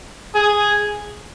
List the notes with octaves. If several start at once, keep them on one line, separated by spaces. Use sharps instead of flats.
G#4